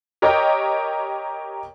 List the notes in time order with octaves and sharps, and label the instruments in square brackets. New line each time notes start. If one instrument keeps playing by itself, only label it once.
[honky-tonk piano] G4 A#4 C#5 D#5 G5